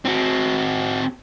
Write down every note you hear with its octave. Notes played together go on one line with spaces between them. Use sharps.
C4 F#4